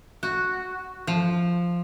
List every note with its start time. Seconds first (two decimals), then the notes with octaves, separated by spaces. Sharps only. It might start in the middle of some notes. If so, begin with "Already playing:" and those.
0.23 F#4
1.07 F3